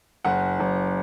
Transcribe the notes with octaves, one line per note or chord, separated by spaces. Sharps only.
F#1 F#5
F#1